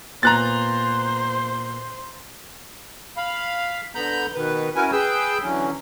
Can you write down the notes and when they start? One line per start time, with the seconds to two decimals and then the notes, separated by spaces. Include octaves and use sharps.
0.23 A#2 B3 C5 A#5 F#6 A6
3.17 F5 B5
3.95 D3 B3 A#5 B5 G6
4.35 B2 D#3 B4
4.76 C#4 E4 F#4 A#4 B4 G#5
4.92 G#4 B4 G5 E6 G6
5.42 D3 E3 F#3 C#4